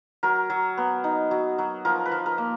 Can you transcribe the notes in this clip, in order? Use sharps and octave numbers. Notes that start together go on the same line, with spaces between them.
F#3 A#4
F#3
B3
D#4
F#3
F#3
F3 A#4
B4
F3
A#4
A#3